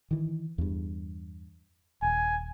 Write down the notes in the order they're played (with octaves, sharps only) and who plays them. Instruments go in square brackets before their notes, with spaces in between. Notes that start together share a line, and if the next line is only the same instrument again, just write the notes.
[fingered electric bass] D#3 E3
E2 G2
[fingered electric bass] D#1 [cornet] G#5